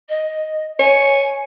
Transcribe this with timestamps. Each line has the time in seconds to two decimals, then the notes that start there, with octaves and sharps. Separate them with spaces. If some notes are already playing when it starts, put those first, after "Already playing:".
0.09 D#5
0.79 C#5 G#5